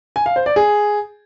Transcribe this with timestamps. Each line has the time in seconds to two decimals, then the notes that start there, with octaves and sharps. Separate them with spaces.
0.16 G#5
0.26 F5
0.36 C5
0.46 D5
0.56 G#4